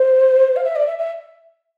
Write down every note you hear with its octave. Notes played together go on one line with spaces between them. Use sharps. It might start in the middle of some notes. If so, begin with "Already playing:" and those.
Already playing: C5
F5
E5
D5
E5
E5